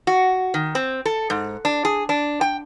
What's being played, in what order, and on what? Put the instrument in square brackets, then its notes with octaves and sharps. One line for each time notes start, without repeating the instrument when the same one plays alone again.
[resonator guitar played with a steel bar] F#4
D#3
C4
A4
G#2
D4
G#4
D4
G5